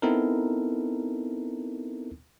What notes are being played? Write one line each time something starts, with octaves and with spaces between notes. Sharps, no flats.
B3 C4 D#4 E4 A4 A#4